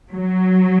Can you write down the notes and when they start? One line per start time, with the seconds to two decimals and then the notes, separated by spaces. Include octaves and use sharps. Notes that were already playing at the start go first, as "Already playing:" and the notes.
0.12 F#3